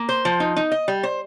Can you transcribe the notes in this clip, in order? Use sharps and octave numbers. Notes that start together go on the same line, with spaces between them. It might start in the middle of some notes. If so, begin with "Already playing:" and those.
Already playing: A#3
C5
F3
D#4
D#4
D#5
G3
C5